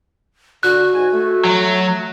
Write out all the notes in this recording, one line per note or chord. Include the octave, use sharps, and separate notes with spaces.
D3 F#4 F#6
G#2 G#5
A3
F#3